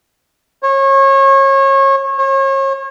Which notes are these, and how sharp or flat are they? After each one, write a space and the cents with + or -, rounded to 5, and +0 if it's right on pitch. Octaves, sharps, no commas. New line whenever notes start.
C#5 -30
C#5 -40